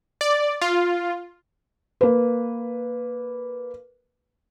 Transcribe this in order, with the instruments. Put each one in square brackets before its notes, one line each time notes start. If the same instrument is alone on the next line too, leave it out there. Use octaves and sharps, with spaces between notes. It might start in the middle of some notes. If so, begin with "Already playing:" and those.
[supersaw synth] D5
F4
[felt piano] A#3 B4